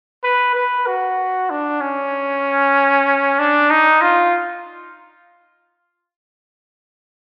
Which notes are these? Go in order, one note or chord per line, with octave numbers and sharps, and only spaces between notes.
B4
B4
F#4
D4
C#4
D4
D#4
F4